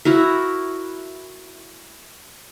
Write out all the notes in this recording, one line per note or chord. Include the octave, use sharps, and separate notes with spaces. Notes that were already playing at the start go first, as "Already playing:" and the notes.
E4 F#4 A#4